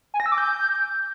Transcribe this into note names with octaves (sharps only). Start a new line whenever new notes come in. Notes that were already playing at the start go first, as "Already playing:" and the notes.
G#5
A#6
E6
D6
G6